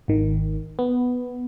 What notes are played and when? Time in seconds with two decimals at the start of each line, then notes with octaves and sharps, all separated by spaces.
0.08 G#1 D#3
0.79 B3